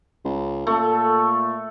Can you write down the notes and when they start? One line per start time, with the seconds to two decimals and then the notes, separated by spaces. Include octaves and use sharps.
0.25 C#2
0.67 A#2 A3 A4